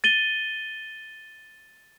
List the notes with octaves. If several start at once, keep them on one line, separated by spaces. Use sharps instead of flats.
A6 D#7 G7